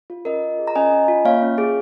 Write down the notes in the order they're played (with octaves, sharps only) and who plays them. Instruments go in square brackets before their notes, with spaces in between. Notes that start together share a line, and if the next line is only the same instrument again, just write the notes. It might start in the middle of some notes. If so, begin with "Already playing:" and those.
[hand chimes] F4
C#4 A#4 D#5
F4
G#4
A#5
C#4 D#5 G#5
C#4
F4
A#3 C#5 F5
C#4
G#4